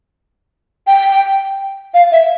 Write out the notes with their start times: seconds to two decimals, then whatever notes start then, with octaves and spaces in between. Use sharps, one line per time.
0.87 G5
1.94 F5
2.12 E5